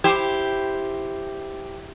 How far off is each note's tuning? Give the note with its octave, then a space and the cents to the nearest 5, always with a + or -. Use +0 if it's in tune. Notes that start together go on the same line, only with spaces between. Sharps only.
E4 +0 G4 +0 C5 +0